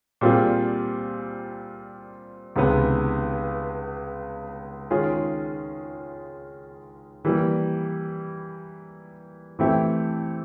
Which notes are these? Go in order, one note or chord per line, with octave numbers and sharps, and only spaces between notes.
A#2 G3 C4 F4 G#4
C#2 C3 D#3 G#3 B3
D#3 G#3 C#4 F4 G#4
E3 G3 A#3
E3 A3 C4 E4 G4